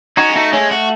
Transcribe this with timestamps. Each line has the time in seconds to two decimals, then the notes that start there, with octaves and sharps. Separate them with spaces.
0.17 C#4 D#4 F#4
0.29 G#3
0.35 A3 D#4 F#4
0.53 G#3 A3 C#4
0.71 A3 F#4